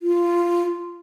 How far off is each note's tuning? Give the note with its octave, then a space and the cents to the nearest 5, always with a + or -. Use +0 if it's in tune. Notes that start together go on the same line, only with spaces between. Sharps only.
F4 -10